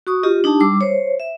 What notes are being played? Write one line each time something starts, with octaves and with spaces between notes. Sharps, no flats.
F#4 C#6 D#6
F4 G4 D#5
D4 D#4 G4 A5
G3 D6 E6
C5 C#5
E5